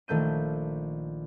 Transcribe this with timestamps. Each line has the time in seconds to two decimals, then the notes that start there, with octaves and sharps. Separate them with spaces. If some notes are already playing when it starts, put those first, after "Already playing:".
0.08 A#1 D#3 A3 G6 D#7